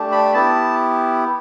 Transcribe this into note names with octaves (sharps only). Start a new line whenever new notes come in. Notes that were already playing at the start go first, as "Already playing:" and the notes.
Already playing: A3 D4 G4
B5
B3 E4 G4 A5